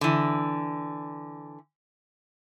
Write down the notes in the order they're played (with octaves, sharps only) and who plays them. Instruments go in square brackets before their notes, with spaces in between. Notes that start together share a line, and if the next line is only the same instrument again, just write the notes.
[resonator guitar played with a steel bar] D3 E3